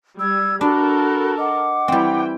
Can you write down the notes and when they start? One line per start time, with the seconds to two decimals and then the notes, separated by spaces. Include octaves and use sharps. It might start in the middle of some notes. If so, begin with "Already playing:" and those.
0.19 G3 E6 G#6
0.61 D4 F#4 A4 A#4 B5
1.38 D#5 F#5 D6
1.88 E3 G3 C4 G5